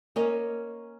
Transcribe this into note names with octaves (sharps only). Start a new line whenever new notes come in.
A#3 C#4 D#5